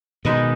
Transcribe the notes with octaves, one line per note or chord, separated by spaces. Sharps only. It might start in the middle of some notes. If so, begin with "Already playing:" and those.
B2 D#3 G#3 D#4 B4 D#5